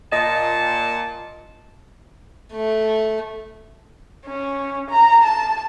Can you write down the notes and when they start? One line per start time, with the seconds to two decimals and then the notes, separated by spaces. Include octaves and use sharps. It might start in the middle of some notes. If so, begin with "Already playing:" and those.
0.12 A#2 D#5 A5
2.52 A3
4.26 C#4
4.90 A#5
5.23 A5